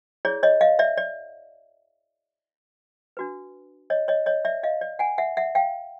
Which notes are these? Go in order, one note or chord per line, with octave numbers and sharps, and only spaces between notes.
E4 G#4 C#5 D5
C#5 D#5
D#5 F5
D5 E5
D5
D4 F#4 B4
C#5 D#5
C#5 D#5
C#5 D#5
D5 E5
D#5 F5
D5
F#5 G#5
E5 F#5
E5 F#5
F5 G5